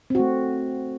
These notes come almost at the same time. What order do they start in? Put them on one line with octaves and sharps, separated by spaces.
C4 F#4 A3